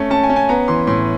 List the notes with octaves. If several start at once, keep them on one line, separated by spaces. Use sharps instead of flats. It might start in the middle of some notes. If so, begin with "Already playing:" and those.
Already playing: A3 C#4
C#4 A5
G#5
C#4
G#5
B3 A#5
E3 C6
A2 C6